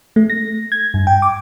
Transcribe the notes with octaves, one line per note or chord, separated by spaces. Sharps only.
A3
A#6
G#6
G2
G5
D6